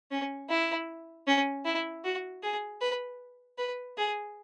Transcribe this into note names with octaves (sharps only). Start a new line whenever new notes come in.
C#4
E4
C#4
E4
F#4
G#4
B4
B4
G#4